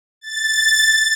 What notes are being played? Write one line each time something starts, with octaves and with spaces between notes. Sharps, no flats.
A6